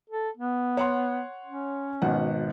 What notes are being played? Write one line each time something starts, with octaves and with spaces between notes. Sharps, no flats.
A4
B3
C#5 F#5 C6
C#4
G#1 B2 F#5